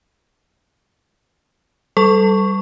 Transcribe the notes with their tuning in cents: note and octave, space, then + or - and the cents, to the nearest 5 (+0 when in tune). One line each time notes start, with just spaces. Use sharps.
G3 -15 A4 +0 C#6 +0